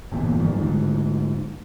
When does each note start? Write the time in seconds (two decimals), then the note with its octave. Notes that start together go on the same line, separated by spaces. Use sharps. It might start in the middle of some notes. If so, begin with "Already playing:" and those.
0.12 G1 E2 A#2
0.40 G#1 F#2 D#3 G3
0.54 D2 G#2